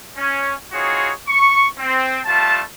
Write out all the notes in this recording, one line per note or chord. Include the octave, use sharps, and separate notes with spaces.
C#4
C4 D#4 F4 F#4 G#4 C#5
C#6
C4
G3 A3 F4 A5